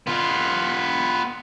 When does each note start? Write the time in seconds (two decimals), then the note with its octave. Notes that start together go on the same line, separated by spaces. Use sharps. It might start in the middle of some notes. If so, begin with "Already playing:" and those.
0.07 B3 F4